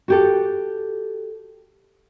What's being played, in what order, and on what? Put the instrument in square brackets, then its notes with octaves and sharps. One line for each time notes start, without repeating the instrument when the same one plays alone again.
[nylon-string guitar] F#4 G4 A4